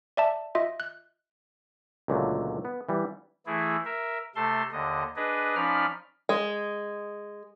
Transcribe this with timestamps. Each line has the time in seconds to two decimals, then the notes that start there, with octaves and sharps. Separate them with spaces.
0.17 D5 E5 A5
0.55 F4 D#5 E5
0.80 F#6
2.08 C#2 A#2 D3 F#3 A3
2.65 B3
2.89 E3 G3
3.46 E3 A3 E4 G#4
3.85 A#4 E5
4.36 C3 A3 A4 A5 C6
4.72 D#2 D3 D#5
5.16 D4 G#4 B4 D#5
5.55 F3 C#4 D#4 D5 B5 F6
6.29 G#3